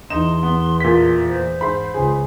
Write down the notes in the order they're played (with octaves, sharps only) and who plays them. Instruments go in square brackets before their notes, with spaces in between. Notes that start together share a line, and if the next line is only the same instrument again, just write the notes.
[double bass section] E2 [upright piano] D#4 [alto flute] C6 [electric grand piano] E7
[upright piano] B3
[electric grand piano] A#2 B6
[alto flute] C5
[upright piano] G#2 [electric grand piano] B5 C6
[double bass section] C#2 [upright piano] G#4